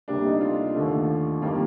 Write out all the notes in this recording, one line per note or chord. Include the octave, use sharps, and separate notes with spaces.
D2 C3 G3 A#3 D4
D#4
F4
D#2 D3 A3
F2 D#3 G3 A#3 F4